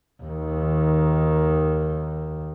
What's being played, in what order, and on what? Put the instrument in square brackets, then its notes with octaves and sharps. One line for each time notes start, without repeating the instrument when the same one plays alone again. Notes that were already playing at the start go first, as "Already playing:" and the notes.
[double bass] D#2 D#3